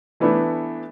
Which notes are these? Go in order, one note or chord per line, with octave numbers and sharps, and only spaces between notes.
E3 A3 B3 D4 E4